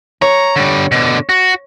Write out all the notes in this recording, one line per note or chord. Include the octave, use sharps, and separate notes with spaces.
C#5 A#5
D3 G3
B2 D3
F#4